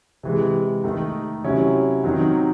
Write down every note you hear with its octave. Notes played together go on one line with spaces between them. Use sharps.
C3 E3 G#3
D#3 A3 D#4
C3 F#3 C#4 E4
D#3 F#3 C4 D#4